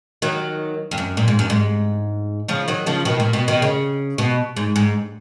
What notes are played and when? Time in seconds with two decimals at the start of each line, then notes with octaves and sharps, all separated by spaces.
0.22 D#3 F#3
0.91 F2
0.98 F#2
1.17 A#2
1.28 G#2
1.39 F#2
1.50 G#2
2.48 C#3 F3
2.68 D#3 F#3
2.86 C#3 F3
3.05 B2 D#3
3.20 A#2
3.33 B2
3.48 B2 D#3
3.62 C#3
4.18 B2
4.57 G#2
4.76 G#2